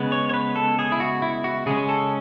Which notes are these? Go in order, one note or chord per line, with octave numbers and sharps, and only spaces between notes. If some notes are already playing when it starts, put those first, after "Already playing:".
Already playing: C#3 G#3 B3
C#5
C#5
B4
A4
G#4
E4
F#4
E4
F#4
C#3 G#3 C#4 G#4
A4